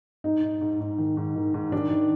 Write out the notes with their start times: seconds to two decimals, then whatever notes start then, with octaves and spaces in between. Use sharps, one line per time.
0.24 G#2 D#4
0.43 G#2
0.61 G#2
0.80 G#2
0.98 D#3
1.17 G#2
1.36 D#3
1.54 G#2
1.72 D#3 D4
1.91 D#3